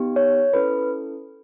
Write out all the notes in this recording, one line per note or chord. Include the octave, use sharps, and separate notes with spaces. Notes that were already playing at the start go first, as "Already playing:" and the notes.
Already playing: B3 D#4 G4
C#5
C#4 E4 A4 B4